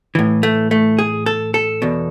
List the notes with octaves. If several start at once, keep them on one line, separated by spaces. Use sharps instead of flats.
A2 E3
A3
A3
G#4
A4
A4
E2 B2